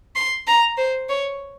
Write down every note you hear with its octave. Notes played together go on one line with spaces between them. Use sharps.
C6
A#5
C5
C#5